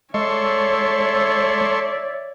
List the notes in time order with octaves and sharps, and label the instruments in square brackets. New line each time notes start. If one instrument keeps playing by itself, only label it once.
[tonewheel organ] G#3 [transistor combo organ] A4 C6 C#6 [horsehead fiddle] C#5 [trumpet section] D5 E5